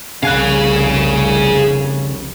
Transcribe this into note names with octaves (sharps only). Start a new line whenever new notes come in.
F1 C2 C#3 G#4 F5 G#5 F#6